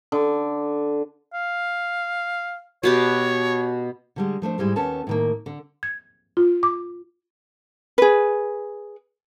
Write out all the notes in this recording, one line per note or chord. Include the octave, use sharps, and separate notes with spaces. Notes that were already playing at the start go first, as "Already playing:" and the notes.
D3
F5
B2 B3 G4 C#5
D3 G3 G#3
F3 A3 D4 C5
G#2 G3 G#3 E4
D#2 B3 C#4 A4 A5
A2 D#3 A#3
D3
G#6
F4
D6
G#4 B4